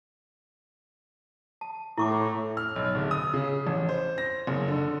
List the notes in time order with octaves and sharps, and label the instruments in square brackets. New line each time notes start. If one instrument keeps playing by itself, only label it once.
[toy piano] A5
[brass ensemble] A2 [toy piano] E4 C#6 D6
[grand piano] F6
B1
D1
D#6
C#3
A1
C5
A#6
F#1
D3